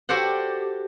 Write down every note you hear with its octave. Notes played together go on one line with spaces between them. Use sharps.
F#4 G4 A4 C5 D5 F#5